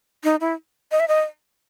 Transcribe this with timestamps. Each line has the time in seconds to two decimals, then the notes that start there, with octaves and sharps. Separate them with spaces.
0.24 D#4
0.41 E4
0.92 D#5
1.00 E5
1.08 D#5